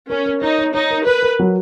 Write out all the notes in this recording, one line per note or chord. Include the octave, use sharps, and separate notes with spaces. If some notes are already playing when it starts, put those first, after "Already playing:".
C#4 A#4
A#4
D#4 C#5
C#5
D#4 C#5
A#4
A#4 B4
A#4
F#3